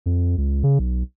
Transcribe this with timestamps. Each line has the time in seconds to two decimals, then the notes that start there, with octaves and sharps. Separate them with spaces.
0.06 F2
0.38 C#2
0.63 C#3
0.79 B1